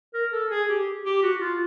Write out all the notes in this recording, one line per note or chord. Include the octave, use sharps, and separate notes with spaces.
A#4
A4
G#4
G4
G4
F#4
F4